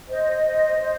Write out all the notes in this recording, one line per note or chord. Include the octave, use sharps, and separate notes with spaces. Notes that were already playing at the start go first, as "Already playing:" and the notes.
C5 D#5
C5
C5